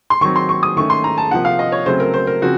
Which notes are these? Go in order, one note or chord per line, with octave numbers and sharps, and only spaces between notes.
C6
D#3 F#3 C4 C#6
C6
C#6
D#6
D#3 A3 C#4 C#6
C6
A#5
A5
C3 F3 A#3 F#5
F5
D#5
C#5
C#3 F#3 A3 C4 C5
A#4
C5
A#4
C#3 F3 C4 F#4